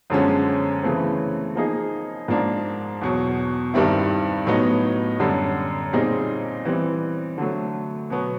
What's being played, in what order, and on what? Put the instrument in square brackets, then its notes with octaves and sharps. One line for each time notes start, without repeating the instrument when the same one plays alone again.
[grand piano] F#2 D3 F3 G#3 C#4
C#3 E3 A3 C4
F3 A#3 D#4 G#4
G#2 F3 A#3 D4
E2 B2 F#3
G2 D#3 G3 C4 E4
A2 F#3 B3 D#4
F#2 D3 G3
A#2 G3 C4 D#4 G#4
E3 G3 C4
D3 F#3 A3
B2 F#3 B3